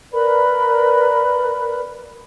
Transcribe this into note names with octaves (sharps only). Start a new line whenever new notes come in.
A#4 B4 D5 B5